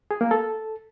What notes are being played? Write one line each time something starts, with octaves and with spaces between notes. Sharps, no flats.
G#4
A#3
A4